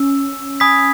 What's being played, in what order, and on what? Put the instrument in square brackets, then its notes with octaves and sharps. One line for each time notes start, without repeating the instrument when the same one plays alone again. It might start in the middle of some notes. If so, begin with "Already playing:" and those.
Already playing: [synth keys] C#4 [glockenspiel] E6
[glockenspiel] G#5 B5 D#6 G#6 B6